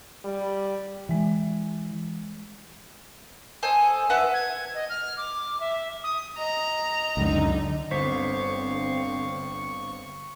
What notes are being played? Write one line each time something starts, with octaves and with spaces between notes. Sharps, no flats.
G3
E3 G#3 E5
A4 C5 D#5 G#5
B4 E5 F#5 A5
G#6
D#5
F6
D6
E5
D#6
D#5 A#5
C#2 F#2 D3 D#4
G1 D3 C4 C5 F5 C#6 B6